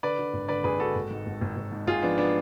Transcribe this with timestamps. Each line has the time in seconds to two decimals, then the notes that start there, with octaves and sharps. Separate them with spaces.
0.03 D3 B4 D5
0.19 D3
0.34 G#1
0.48 D3 B4 D5
0.64 G#1 G#4 B4
0.79 D3 F#4 A4
0.95 G#1
1.11 G#2
1.26 G#1
1.41 G#1
1.56 G#1
1.71 G#2
1.87 G#1 F4 G#4
2.02 F3 B3 D4
2.18 B3 D4